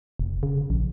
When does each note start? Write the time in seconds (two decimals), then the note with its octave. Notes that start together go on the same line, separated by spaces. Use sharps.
0.19 F1
0.43 C#3
0.70 A#1